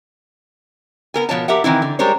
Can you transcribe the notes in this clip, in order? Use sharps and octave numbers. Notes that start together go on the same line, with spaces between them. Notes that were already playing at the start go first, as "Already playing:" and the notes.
B3 A#4 G#5
B2 F3 C#5 A5
G4 A#4 E5 F#5
D#3 E3 C4 E4
D3
G3 G#3 A#4 C5 C#5